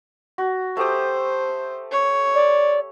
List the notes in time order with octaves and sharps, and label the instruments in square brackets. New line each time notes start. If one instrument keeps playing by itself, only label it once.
[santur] F#4
[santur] A3 G4 D#6 [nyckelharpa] C5
[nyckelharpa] C#5
[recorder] D5